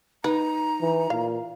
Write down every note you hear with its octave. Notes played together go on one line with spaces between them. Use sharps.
D#4 B4 A#5
E3
A#2 F5